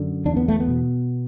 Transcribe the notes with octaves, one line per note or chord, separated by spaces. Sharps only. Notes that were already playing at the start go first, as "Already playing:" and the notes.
Already playing: F#2 D3
E2 D4
B3
A3
B3
B2